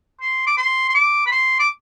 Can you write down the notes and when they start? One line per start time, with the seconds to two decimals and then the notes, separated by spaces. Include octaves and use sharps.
0.21 C6
0.47 D6
0.57 C6
0.90 C6
0.95 D6
1.26 B5
1.32 C6
1.59 D6